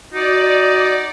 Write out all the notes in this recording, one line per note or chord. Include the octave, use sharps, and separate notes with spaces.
D#4 F#4 D5